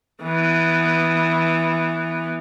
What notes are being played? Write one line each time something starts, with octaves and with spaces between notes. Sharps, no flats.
E3 B3